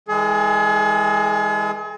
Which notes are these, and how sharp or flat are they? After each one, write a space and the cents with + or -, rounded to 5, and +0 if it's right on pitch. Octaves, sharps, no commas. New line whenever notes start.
E3 -35 G#3 -25 G#4 +40